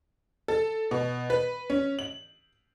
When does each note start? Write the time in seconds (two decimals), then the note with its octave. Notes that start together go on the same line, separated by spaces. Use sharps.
0.48 A4
0.91 B2
1.30 B4
1.70 C#4
1.99 F#7